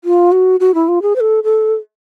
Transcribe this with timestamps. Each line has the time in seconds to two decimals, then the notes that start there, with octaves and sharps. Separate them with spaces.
0.04 F4
0.32 F#4
0.60 F#4
0.74 E4
0.88 F4
1.02 G#4
1.16 C5
1.20 A4
1.44 A4